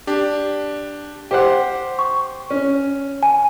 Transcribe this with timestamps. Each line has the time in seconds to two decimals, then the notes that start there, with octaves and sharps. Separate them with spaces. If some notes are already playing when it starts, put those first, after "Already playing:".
0.07 D4 G4
1.31 G4 C5 F#5
1.99 C#6
2.50 C#4
3.23 G#5